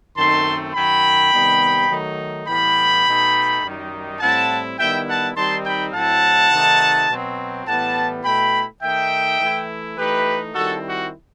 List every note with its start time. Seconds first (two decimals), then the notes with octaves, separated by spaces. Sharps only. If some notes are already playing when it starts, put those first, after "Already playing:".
0.16 F#2 D#3 A3 C4 D#4 A5 C6
0.74 F#2 D#3 F#3 G5 B5
1.32 C3 D#3 G3 B3 D#4
1.90 D#3 F#3 A3 D#4
2.47 A2 E3 G3 B3 G5 B5
3.05 B2 A3 D#4
3.63 F#2 D#3 G3 D#4
4.20 A2 G3 C4 E4 F#5 A5
4.78 D#3 G3 B3 E4 E5 G5
5.07 F#5 A5
5.36 D#3 G3 C4 D#4 A5 C6
5.65 G5 B5
5.93 A2 F#3 C4 E4 F#5 A5
6.51 C3 D#3 A3 D#4
7.09 B2 F#3 C4
7.66 A2 E3 G3 B3 F#5 A5
8.24 B2 A3 E4 G5 B5
8.82 D#3 A3 D#4 E5 G5
9.40 E3 A3 E4
9.97 E3 A3 D#4 G4 B4
10.55 D#3 G3 C4 E4 F#4 A4
10.85 F#4